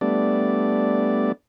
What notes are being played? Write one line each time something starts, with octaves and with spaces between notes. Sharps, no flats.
G3 A3 B3 D4 D5